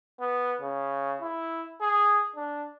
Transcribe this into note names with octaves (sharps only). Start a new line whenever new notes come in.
B3
C#3
E4
G#4
D4